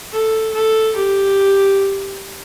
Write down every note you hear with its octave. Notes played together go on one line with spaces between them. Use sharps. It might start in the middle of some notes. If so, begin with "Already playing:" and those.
A4
A4
G4